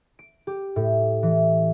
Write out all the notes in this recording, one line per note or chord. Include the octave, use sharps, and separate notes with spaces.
D7
G4
A2
E3